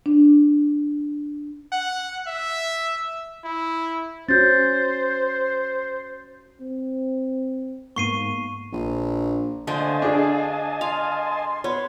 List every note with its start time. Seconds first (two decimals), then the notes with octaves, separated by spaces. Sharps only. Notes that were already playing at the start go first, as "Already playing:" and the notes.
0.06 D4
1.72 F#5
2.27 E5
3.44 E4
4.29 C#4 F#4 C5 G6 A6
6.61 C4
7.96 G#2 A#3 B3 C#6 C7 D#7
8.72 A#1
9.67 D3 A3 C5 D#5 F5 G#5 A5
10.02 D4 G#4
10.81 F5 C6
11.64 B3 C#5